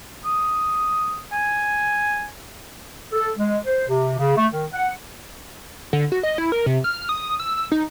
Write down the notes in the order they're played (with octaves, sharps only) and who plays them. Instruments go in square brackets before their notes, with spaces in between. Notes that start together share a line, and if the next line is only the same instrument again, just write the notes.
[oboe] D#6
G#5
[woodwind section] A4
G#3
C5
C3
C#3
A3
D#3
F#5
[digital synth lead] D3
F#4
D#5
E4
A#4
C3
F6
D#6
E6
D#4